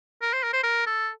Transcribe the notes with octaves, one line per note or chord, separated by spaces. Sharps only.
A#4
C5
A#4
C5
A#4
A4